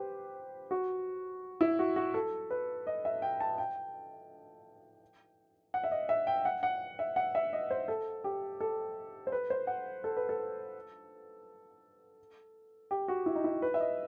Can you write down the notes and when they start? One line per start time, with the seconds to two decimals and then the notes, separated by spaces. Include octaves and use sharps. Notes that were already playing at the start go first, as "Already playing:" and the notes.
Already playing: G4 B4 C5
0.71 F#4
1.61 E4
1.79 F#4
1.96 F#4
2.14 A4
2.51 B4
2.87 D#5
3.05 E5
3.22 G5
3.40 A5
3.58 G5
5.74 F#5
5.84 E5
5.91 D#5
6.09 E5
6.27 G5
6.45 F#5
6.63 F#5
6.99 E5
7.16 F#5
7.35 E5
7.53 D#5
7.71 C5
7.88 A4
8.24 G4
8.60 A4
9.27 C5
9.32 B4
9.50 C5
9.67 F#5
10.04 A4
10.17 B4
10.29 A4
12.91 G4
13.08 F#4
13.26 E4
13.35 D#4
13.44 E4
13.62 B4
13.74 E5
13.80 D#5